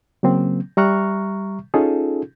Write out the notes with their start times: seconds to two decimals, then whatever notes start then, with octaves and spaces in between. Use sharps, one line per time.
0.23 C#3 F#3 A#3 C4
0.77 G3 E5 A#5 C#6 F6 F#6
1.74 C#4 D#4 F4 G#4 A4